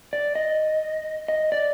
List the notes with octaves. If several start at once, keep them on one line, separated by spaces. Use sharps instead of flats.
D5
D#5
D#5
D5